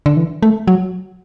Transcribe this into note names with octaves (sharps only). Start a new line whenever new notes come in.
D3
E3
A3
F#3